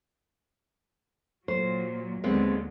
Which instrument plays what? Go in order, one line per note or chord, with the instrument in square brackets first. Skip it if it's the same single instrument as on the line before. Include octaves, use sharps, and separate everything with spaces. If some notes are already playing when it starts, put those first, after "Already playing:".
[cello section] A#2 F#3 [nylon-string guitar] C5
[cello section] D#2 D3 [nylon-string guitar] G#3 B3 C4